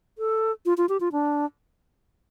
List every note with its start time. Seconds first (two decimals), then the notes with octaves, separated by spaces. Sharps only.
0.18 A4
0.66 F4
0.78 F4
0.89 G4
1.00 F4
1.12 D4